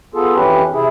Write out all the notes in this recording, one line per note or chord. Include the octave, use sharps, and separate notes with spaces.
B3 F4 G#4 A4
F2 E3 C#4 G4 B4
C3 E4 G#4